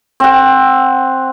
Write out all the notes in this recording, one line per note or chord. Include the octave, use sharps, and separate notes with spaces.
C4 F#5